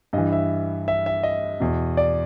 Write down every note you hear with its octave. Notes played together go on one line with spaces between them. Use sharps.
G2 E3 D#5
E5
E5
E5
D#5
E2 B2
D5